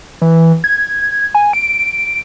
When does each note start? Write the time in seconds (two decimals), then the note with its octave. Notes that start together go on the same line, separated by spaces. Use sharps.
0.22 E3
0.64 G#6
1.35 G#5
1.53 D7